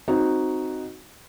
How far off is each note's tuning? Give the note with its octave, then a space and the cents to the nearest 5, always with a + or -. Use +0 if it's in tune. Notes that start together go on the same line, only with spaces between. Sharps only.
C4 +0 D#4 +0 F#4 +0